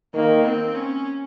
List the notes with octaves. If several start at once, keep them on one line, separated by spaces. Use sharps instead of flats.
D#3 A#3
C4
C#4